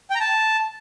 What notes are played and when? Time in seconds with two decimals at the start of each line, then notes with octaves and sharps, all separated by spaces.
0.10 G5
0.15 A#5
0.20 A5